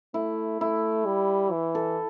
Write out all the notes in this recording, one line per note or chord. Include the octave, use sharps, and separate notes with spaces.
A3 E4
A3 E4
G3
E3
A4